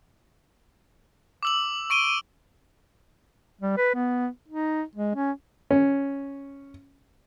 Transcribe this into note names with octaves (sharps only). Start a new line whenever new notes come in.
D6 E6 F#7
C#6 D7 D#7 G7
G3
B4
B3
D#4
G#3
C#4
C#4